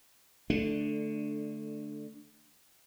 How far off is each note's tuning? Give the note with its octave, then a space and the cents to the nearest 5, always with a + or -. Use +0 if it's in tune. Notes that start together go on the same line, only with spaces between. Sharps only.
D3 +5 A3 -5 D4 +15